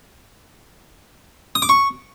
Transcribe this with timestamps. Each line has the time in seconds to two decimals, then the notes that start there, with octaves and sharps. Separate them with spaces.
1.55 D#6
1.62 D6
1.69 C#6